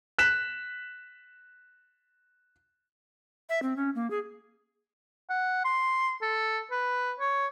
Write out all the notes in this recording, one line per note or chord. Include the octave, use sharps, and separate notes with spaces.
F#6 B6 E7
E5
C4
C#4
A#3
G#4
F#5
C6
A4
B4
C#5